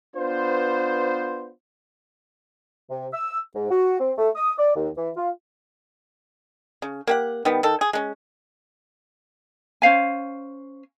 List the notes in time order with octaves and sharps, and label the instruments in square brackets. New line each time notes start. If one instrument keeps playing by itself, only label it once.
[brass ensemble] B3 D4 F4 B4 C5
[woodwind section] C3
E6
G#2
F#4
C4
A3
D#6
D5
D#2
E3
F4
[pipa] C#3
A#3 G4 F#5
D#3 G3 B3
D#3 A4
G#4
G#3 C#4
[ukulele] C#4 C5 F5 G#5